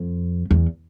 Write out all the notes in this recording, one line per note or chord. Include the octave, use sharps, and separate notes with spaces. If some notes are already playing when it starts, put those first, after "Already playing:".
Already playing: F2
E2